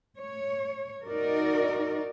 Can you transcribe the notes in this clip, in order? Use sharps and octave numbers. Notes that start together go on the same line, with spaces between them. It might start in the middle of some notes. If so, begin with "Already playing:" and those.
C#5
D#4 F#4 A#4 D5